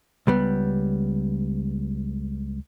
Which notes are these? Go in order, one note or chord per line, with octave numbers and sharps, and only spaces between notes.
C#2 G3 B3